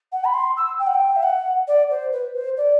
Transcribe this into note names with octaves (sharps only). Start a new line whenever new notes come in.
F#5
B5
C6
E6
G5
F#5
G5
E5
F#5
D5
C5
B4
C5
D5